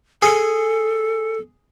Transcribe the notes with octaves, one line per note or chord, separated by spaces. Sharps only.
G#4 A4